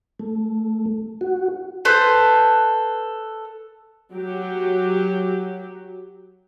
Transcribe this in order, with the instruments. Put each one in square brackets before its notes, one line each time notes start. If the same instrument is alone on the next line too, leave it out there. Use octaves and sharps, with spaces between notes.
[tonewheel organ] A3
F#4
[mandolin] A4 B4 C5
[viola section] F#3 G4